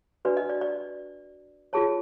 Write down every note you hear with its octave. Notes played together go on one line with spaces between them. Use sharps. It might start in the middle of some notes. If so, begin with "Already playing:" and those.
D4 F#4 B4 D5
D#5
D5
D5
F4 G#4 C#5 A5